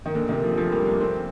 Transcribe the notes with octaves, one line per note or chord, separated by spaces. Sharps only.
D#3
A#2 D3
C3 D#3
D3 F3
F3 A3
G3 A#3
A#3 D4
A3 C4